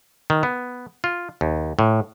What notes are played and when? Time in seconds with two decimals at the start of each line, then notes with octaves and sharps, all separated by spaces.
0.30 D#3
0.43 B3
1.04 F4
1.41 D#2
1.79 A2